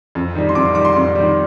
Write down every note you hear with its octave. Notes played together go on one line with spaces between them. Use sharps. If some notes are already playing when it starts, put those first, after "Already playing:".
F2
D#3 G3
C6
F2 D6
C6
D#3 G3 D6
C6
F2
D#3 G3